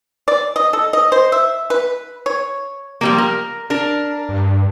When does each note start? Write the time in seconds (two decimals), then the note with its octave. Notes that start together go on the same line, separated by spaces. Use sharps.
0.28 D5
0.56 D#5
0.73 A4
0.93 D#5
1.12 C5
1.32 E5
1.70 B4
2.26 C#5
3.01 F3 G3 A#3
3.18 A#4
3.70 D4 A#4
4.29 G2